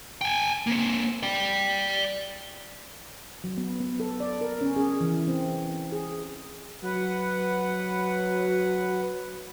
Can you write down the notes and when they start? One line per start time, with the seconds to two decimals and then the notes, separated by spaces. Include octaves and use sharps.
0.21 G5 G#5
0.67 A#3 C4
1.23 D5 G5
3.44 F#3
3.57 B3
3.80 B3
4.00 A4
4.20 D5
4.41 A#4
4.61 C#4
4.76 G#4
5.01 E3
5.28 C4
5.92 G#4
6.84 F#3 B4 F#5